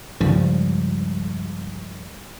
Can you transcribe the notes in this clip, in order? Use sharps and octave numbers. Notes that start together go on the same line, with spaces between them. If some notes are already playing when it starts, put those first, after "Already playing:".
C#2 G2 F3 G3